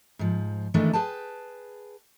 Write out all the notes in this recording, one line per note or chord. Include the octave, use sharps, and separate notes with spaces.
G#2 F3
D#3 E3 G#3 A3 D4
G#4 B4 G5 A5